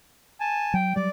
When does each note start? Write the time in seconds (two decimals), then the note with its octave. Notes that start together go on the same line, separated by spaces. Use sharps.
0.40 G#5 A5
0.74 F#3 G5
0.96 F#3 G3 D5